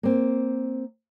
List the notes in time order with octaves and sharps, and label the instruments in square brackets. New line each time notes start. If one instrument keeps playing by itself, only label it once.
[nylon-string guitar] A#3 C4